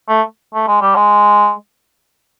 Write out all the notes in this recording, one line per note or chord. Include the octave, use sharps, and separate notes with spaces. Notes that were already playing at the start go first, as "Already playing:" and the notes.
A3
A3
G#3
G3
G#3